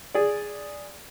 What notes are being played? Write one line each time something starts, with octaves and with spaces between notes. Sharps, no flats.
G#4 D5